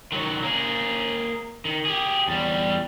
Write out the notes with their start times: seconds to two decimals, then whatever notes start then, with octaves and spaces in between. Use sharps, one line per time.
0.12 D#3 F#3
0.43 A#3 G#4
1.65 D#3
1.85 G4 G#4
2.28 E2 G3